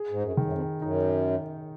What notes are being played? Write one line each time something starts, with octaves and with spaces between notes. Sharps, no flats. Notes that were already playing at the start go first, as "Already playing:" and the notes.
Already playing: G#4
G#2
F#2
D#3
F#2
F2
F#2 D#4